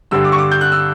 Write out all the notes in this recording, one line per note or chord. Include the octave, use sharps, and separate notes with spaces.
G2 D3 G3 E6
D6
C#6
D6
G6
F#6
E6